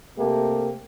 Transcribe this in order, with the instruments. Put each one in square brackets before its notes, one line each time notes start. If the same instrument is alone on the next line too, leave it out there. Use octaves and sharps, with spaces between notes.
[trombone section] C3 A3 A#3 G4